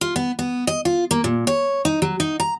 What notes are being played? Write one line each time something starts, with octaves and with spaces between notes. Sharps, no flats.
F4
B3
B3
D#5
F4
A#3
A#2
C#5
D#4
F#3
D#4
A#5